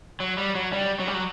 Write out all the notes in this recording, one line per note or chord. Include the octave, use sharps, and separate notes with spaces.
F#3
G3
F#3
G3
F#3
G3
F#3